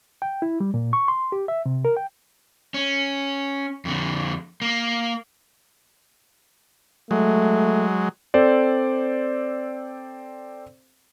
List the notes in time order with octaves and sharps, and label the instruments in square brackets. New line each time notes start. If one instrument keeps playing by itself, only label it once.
[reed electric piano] G5
E4
G3
A#2
C#6
C6
G4
E5
C3
A#4
G5
[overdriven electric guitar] C#4
F2 D3
A#3
[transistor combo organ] F#3 G#3 [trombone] A3
[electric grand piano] C4 A4 C5 D5